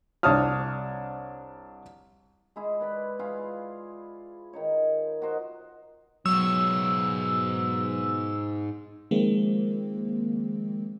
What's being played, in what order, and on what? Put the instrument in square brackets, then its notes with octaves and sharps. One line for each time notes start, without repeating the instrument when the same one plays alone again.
[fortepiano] C2 D4 C#5 A5 D#6 F6
[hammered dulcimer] G#3 E4 G#4
B4 D5 B5
E4 F4 G#4 F5
D#3 D#4 C#5
F#4 A#4 C5 D#5
[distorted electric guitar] G#2 C#5 [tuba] B2 [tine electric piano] F#3 [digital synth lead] E6
[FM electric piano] D#3 F3 G#3 A#3 C4